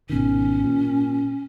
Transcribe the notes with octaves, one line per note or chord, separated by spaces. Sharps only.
G#1 B2 D#3 C#4
A#2